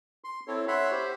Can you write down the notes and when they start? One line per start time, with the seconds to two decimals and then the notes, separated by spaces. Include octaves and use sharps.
0.24 C6
0.48 C4 E4 A4 C#5
0.68 C#5 E5 F#5 B5 C6
0.91 G4 C5